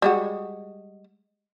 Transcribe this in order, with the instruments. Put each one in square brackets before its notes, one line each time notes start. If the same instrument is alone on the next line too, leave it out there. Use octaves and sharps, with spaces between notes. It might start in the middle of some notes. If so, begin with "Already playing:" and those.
[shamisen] G3 G#3 F#4